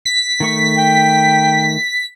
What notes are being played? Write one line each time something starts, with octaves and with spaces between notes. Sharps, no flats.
B6
D#3 A3 C#6
G5